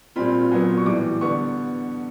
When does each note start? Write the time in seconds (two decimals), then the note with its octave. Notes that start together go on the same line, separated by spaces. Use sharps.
0.16 A#2 G3 C4 F4 B5
0.51 A#2 F#3 B3
0.77 C#6
0.86 A2 E3 G3 D6
1.21 D3 G3 B3 C#6